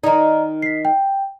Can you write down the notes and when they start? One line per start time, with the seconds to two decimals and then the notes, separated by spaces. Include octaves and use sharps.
0.04 D#3 D#4 D5 D#5 A#5
0.62 B6 C7
0.85 G5